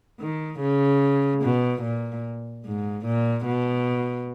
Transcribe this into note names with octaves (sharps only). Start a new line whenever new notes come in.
D#3
C#3
B2
A#2
G#2
A#2
B2